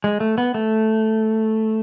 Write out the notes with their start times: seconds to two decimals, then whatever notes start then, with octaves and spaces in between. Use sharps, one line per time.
0.04 G#3
0.20 A3
0.38 B3
0.54 A3